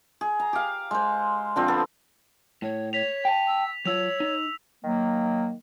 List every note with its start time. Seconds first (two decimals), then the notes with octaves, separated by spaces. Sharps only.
0.21 G#4
0.40 A#5
0.53 G4 F5
0.91 G#3 C5
1.56 D3 F3 C4
1.68 B3 A4
2.62 A2 C#5
2.93 C#5 B6 F7
3.25 G5 A5
3.47 E6
3.85 F#3 F4 C#5 E6 F7
4.20 D#4
4.84 D#3 F#3 A#3